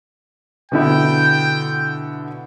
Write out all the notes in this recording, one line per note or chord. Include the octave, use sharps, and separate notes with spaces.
B2 D3 E4 G5